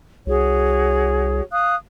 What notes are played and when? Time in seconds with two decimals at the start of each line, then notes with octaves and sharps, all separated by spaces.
0.26 C2 F#4 G#4 C#5
1.52 F5 D#6 F#6